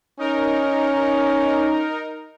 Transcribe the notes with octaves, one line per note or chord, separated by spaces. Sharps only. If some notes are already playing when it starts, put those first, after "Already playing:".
C#4 D#4 A#4